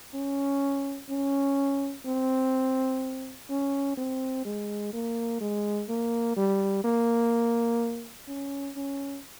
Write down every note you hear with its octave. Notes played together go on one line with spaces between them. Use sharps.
C#4
C#4
C4
C#4
C4
G#3
A#3
G#3
A#3
G3
A#3
C#4
C#4